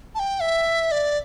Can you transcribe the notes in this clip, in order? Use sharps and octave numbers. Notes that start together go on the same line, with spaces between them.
A5
G5
E5
D5